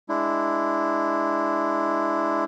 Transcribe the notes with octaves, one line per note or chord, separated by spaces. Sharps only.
G#3 D4 E4